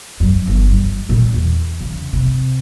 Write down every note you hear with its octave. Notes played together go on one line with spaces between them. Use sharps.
F#2
G1
G3
A#2
E2
C#3
C3